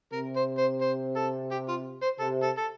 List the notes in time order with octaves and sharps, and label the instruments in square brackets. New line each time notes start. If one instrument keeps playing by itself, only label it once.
[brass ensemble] C3 [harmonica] A#4
[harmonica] C5
C5
C5
A4
G4
F4
C5
[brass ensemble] C3 [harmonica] A4
[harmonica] A4
A4